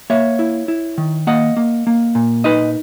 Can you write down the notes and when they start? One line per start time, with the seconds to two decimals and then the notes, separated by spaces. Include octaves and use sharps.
0.10 A#3 C#5 E5
0.39 E4
0.68 E4
0.98 D#3
1.27 A#3 D#5 F#5
1.57 A#3
1.87 A#3
2.15 A#2
2.44 D#4 B4 D#5